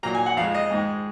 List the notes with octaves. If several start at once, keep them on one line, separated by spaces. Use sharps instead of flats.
A#2 F#3 A#3 A#5
G#5
F#5
F2 F3 G#3 F5
D#5
G#2 D#3 G#3